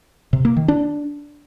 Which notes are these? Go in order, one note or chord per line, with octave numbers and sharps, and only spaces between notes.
C3
A#3
D#3
D4